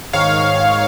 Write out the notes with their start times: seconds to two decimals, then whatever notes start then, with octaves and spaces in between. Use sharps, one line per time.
0.13 G#2 D#3 C#5 F5